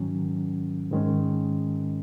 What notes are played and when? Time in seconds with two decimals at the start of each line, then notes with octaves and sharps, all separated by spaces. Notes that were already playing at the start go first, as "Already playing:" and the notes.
Already playing: G#2 D#3 F#3 C#4
0.91 G#2 D#3 G#3 C#4